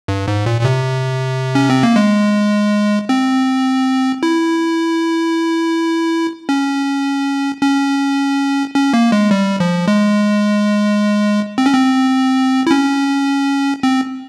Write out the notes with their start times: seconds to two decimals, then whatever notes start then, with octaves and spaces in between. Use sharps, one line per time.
0.08 G2
0.28 G#2
0.46 A#2
0.61 A#2
0.65 C3
1.55 C#4
1.70 C4
1.83 A#3
1.96 G#3
3.09 C4
4.23 E4
6.49 C#4
7.62 C#4
8.75 C#4
8.93 A#3
9.12 G#3
9.31 G3
9.60 F3
9.88 G#3
11.58 C4
11.66 C#4
11.74 C4
12.67 E4
12.71 C#4
13.83 C4